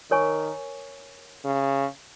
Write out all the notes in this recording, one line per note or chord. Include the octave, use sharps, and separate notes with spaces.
D#3 A#4 C#5 G#5 C#6
C#3